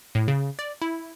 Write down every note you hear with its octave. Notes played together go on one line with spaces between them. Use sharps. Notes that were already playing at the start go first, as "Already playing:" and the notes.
A2
C#3
D5
E4